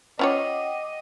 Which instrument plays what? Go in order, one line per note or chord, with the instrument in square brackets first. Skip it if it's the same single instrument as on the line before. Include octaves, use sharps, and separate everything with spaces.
[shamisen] C#4 F4 C#5 [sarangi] D#5 [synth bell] F#5 G5 D6